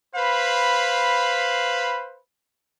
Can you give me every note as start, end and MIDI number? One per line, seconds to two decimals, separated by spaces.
0.16 2.19 71
0.16 2.19 72
0.16 2.19 77
0.16 2.19 83